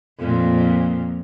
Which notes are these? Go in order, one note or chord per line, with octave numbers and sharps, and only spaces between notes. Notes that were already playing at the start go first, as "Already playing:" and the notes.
F2 A#2